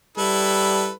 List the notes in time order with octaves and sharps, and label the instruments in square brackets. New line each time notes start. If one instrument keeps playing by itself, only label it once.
[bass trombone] G3 [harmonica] E4 A4 B4